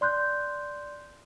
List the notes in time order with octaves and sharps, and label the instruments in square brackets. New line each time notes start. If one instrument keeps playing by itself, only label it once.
[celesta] D5 C6 F#6 G6